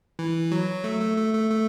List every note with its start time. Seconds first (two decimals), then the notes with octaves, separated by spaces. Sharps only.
0.19 E3
0.52 F#3
0.84 A3
1.01 A3
1.17 A3
1.34 A3
1.50 A3